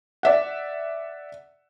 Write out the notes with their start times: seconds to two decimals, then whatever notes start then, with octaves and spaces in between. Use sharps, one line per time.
0.23 D5 E5 F#5